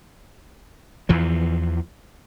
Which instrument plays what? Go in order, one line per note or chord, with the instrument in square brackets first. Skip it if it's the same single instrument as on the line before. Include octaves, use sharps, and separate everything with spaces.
[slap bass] E2 E3 F3